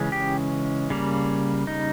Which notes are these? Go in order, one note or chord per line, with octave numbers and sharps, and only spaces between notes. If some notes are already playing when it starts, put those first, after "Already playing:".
Already playing: C#3 E3 G#3 C#4
G4
C#3 G3 A#3
D#4